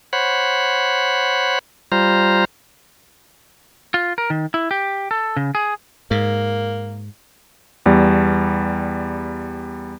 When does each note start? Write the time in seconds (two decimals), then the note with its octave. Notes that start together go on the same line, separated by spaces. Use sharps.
0.13 C5 C#5 F#5 B5
1.92 G3 F4 C5 A#5
3.94 F4
4.18 A#4
4.30 D#3
4.54 E4
4.71 G4
5.11 A4
5.37 C#3
5.55 G#4
6.11 G#2 A#3
7.86 E2 G3